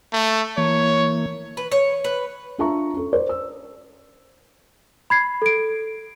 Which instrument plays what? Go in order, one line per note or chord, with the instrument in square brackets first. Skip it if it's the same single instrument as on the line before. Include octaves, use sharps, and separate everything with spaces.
[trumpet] A3
[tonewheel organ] E3 A#3 [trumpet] C#5
[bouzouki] B4
C#5
B4
[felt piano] D4 F4 E5 A5 A#5 C#6
C#4 A4
C5 D5
E6
[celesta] B5 G#6 C7
A4 D7